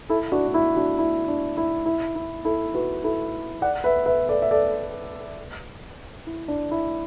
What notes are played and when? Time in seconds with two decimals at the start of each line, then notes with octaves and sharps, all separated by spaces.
0.09 E4 A4
0.32 D4 F#4
0.48 D4
0.54 E4
0.76 D4 F#4
0.99 E4
1.28 D4
1.57 E4
1.86 E4
2.15 E4
2.45 E4 A4
2.74 F#4 B4
3.04 E4 A4
3.62 D5 F#5
3.84 B4 E5
4.06 B4 E5
4.29 A4 D5
4.42 E5
4.51 A4 D5
6.27 E4
6.48 D4
6.71 E4